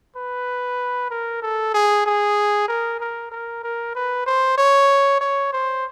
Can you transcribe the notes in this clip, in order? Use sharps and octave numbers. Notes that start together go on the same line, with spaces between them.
B4
A#4
A4
G#4
G#4
A#4
A#4
A#4
A#4
B4
C5
C#5
C#5
C5